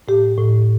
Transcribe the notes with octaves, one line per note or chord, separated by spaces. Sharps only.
A2 G4
A2